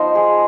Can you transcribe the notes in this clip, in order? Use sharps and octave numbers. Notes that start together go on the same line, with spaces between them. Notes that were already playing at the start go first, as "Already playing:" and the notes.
Already playing: F3 B3 D#4 C5 D#5
G#4